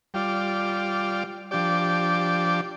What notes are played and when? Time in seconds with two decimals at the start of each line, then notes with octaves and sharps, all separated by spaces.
0.14 G3 F4 D5
1.51 F3 D4 G4 D5